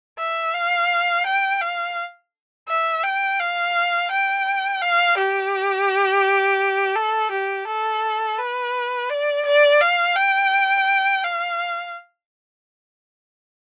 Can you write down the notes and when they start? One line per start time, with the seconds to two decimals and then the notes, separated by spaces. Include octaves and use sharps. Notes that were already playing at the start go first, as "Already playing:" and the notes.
0.18 E5
0.54 F5
1.26 G5
1.61 F5
2.68 E5
3.03 G5
3.39 F5
4.11 G5
4.82 F5
5.18 G4
6.96 A4
7.31 G4
7.67 A4
8.38 B4
9.10 D5
9.45 D5
9.81 F5
10.16 G5
11.24 F5